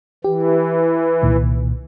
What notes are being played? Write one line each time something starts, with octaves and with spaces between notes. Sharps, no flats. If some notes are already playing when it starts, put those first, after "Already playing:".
E3 G4
C2 A#2 D#3